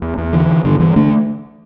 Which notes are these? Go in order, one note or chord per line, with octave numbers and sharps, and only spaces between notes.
E2
E2
D3 E3
D3
G2 D3
G2 E3
D3 A3 D4